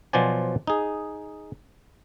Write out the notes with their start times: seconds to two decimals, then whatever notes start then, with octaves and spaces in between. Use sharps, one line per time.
0.13 B2 F3 F#3 C5 D5 G#5
0.67 D#4 G#4